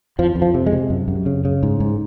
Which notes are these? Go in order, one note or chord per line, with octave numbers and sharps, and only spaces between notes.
F2 F3
F2
F3
C3
G#3
C3
F#2
F#2
C#3
C#3
G#2
G#2